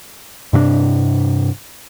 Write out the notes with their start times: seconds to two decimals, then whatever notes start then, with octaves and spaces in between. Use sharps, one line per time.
0.53 G2 C3 C4 D4